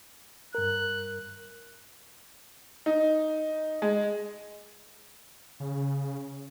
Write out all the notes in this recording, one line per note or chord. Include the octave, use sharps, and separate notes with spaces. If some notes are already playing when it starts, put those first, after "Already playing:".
G2 A#4 F#6
D#4
G#3
C#3